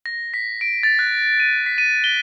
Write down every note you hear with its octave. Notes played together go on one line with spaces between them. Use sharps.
A#6
B6
D7
A6
F#6
D#7
B6
D#7
G7